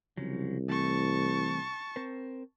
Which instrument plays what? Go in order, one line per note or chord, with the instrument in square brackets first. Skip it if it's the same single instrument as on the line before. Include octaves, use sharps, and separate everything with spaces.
[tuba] C2 [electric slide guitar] C#3 F3 F#3
[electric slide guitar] E3 A3 C4 [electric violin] A5 C#6
[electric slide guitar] C4 A#4 C5